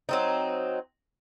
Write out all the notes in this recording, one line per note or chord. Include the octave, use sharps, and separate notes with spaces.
F#3 C4 D#4